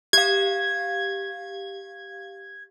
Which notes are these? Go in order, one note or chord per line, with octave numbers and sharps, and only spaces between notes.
G4 F5 G#6